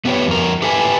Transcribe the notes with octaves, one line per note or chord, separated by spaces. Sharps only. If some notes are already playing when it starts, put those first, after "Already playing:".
A3 B3 C4 G4 B4 C#5
F2 A#4
G4 A4 B4 E5 G#5